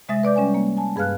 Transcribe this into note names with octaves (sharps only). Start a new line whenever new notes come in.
C3 G#3 E5 D#6 A6 A#6
B4 D5 D6 G6
G3 C#4 C#5 G#5
A#3
G#5 A5
G2 G#4 B4 F5 F6 F#6